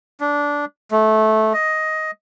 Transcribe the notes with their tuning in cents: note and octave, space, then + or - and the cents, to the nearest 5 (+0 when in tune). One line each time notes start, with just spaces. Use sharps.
D4 -15
A3 -15
D#5 +10